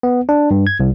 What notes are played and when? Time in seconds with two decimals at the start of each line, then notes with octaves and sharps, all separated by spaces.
0.03 B3
0.29 D4
0.51 G2
0.67 G#6
0.80 C2